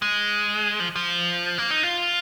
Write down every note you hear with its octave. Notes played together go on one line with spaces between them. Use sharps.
G#3
F3
F3
A#3
D#4
F4